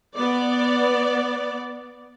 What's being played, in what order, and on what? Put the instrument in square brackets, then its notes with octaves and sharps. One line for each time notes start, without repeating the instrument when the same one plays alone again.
[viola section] B3 D5